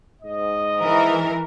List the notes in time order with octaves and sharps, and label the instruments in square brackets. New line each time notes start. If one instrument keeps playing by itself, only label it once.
[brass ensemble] G#2 D#5
[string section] E3 A#4